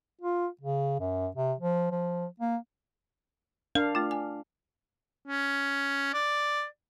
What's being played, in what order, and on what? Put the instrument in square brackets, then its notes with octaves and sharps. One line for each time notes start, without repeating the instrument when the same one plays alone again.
[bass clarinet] F4
C#3
F#2
C3
F3
F3
A#3
[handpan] D4 F5 [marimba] A#4
[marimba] A3 F4
G#5
[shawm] C#4
D5